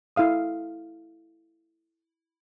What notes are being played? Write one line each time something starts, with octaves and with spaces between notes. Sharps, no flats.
E4 A4 F5 D#6